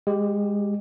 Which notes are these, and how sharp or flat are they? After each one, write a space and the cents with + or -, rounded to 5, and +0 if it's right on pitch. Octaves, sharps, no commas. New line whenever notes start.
G#3 -20 G4 +0